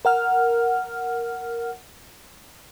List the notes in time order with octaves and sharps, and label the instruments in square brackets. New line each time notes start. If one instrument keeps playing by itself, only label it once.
[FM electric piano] A#4 F#5 F6